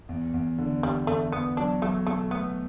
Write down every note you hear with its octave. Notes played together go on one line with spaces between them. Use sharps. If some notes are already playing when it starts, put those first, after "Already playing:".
E2
E2
D3
E2 G3
E2 A3
E2 B3
F#3 D4
F#3 A3
B2 A3
A3 B3